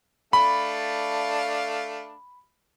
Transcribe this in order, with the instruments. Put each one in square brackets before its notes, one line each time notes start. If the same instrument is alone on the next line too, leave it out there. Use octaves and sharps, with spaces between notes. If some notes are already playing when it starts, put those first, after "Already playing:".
[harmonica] A3 D4 F5 [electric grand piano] B5